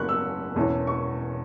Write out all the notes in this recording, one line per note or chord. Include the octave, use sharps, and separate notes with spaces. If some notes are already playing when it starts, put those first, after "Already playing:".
Already playing: F#1 F#3 B5 C#6 F#6
E6
E1 E2 E3 C#4 E4
C#6